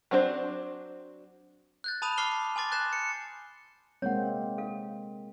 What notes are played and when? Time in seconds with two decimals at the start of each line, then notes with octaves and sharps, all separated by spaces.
0.11 F#3 C4 D4 A4 C5
1.84 F#6 G6 A6
2.02 A5 B5 D#6 D#7 F7
2.18 A5 D6 F6 C7 F7 G7
2.56 G#5 C6 D6 A6 C7
2.72 F#6 G6 A6 A#6 C7 E7
2.93 C#7
4.02 G#3 A#3 C4 C#5 F#5
4.58 A4 F5